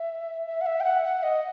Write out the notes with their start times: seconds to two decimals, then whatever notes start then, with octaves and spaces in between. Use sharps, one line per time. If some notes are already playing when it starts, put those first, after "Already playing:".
Already playing: E5
0.46 E5
0.61 F#5
0.66 E5
0.80 G5
0.84 F#5
1.04 F#5
1.23 D#5